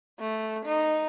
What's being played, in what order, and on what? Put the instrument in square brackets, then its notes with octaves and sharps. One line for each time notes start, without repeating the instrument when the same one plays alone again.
[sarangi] A3
D#4